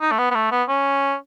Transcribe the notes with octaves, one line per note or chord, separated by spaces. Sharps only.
D#4
A3
B3
B3
A3
B3
C#4